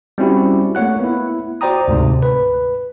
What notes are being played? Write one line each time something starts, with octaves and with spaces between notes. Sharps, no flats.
G3 C4 C#4 E4 F#4 G4
A3 A#3 C#5 F#5 F#6
B3 E4
F#4 C5 D5 G5 A#5 D#6
D2 G#2 C3
B4